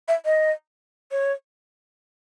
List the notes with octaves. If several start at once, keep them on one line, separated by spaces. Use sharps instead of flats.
E5
D#5
C#5